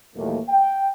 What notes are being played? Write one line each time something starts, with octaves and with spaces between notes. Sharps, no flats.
D#2 A#2 E3 F#3 A3 A#3
G5